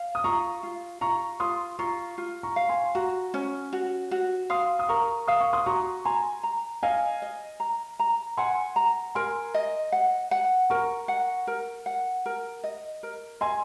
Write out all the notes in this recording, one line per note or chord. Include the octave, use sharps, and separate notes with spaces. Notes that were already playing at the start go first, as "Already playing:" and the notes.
Already playing: F5
D#6
F4 A#5 C#6
F4
F4 A#5 C#6
F4 C6 D#6
F4 A#5 C#6
F4
A#5 C#6
F5
G#5 C6
F#4 A#5 C#6
C#4
F#4
F#4
F5 C6 D#6
D#6
A#4 A#5 C#6
F5 D#6
C#6
C6 D#6
F#4 A#5 C#6
G#5 A#5 C6
A#5
D#5 F5 G#5
D#5
A#5
A#5
F#5 G#5 C6
A#5
A#4 G#5 C6
D#5
F#5
F#5
A#4 A#5 C#6
F#5
A#4
F#5
A#4
D#5
A#4
D#5 G#5 C6